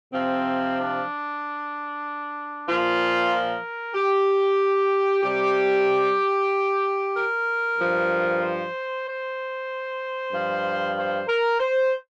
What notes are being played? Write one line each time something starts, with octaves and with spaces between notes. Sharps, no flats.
C3 F3 C4
D4
A#2 F3 F4
A#4
G4
C3 G3 G4
A#4
G2 F3
C5
C5
G2 F3
C5
A#4
C5